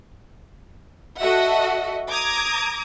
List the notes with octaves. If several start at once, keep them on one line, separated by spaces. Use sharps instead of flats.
F#4 A4 D#5 E5 F#5
A#5 D6 D#6 G#6